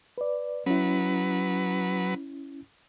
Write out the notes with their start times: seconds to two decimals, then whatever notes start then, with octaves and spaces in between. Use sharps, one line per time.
0.18 B4 D5
0.66 F#3 C#4 E4 B4